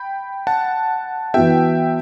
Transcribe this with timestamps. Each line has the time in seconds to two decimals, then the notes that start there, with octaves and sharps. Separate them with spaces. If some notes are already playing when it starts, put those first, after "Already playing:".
Already playing: G5 B5
0.47 F#5 A5
1.34 E3 B3 F#4 E5 G5